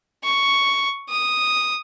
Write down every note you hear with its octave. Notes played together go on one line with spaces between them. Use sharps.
C#6
D#6